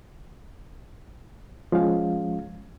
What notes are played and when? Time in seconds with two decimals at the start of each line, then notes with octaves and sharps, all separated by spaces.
1.72 F3 G#3 C#4 F5